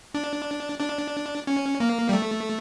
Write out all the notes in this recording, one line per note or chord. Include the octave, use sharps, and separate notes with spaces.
D4
D4
C#4
A#3
G3
A3